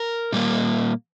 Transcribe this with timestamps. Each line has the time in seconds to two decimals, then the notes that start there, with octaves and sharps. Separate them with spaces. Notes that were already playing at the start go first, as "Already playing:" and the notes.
Already playing: A#4
0.32 A#2 G3 A#3